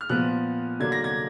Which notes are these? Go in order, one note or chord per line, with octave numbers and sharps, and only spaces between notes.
F6
A#2 F3 B3 F#6
D3 F#3 A#3 D4 G#6
A#6
G#6